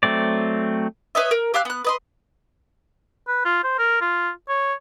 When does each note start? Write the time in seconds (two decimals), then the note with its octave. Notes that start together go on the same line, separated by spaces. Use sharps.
0.03 F#3 A3 C4 D5
1.15 B4 C#5 D#5 E5
1.31 A#4
1.54 G4 F5 E6 F#6
1.65 B3 F#6
1.85 B4 D#5 C6
3.28 B4
3.45 F4
3.64 C5
3.79 A#4
4.01 F4
4.49 C#5